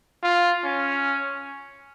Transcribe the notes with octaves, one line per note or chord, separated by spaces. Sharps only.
F4
C#4